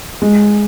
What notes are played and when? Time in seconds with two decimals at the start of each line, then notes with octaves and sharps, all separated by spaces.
0.22 G#3